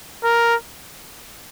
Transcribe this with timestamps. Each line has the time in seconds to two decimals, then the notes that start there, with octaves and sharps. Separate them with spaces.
0.24 A#4